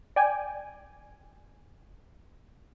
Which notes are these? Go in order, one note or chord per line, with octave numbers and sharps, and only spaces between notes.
D5 G5 G#5